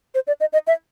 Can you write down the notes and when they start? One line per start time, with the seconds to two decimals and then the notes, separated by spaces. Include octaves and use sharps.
0.15 C5
0.27 D5
0.40 D#5
0.53 D#5
0.67 E5